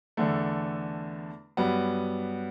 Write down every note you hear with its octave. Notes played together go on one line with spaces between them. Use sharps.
E2 D3 A3
G2 F#3 B3